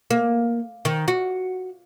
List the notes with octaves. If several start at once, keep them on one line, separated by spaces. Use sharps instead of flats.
A#3
D#3
F#4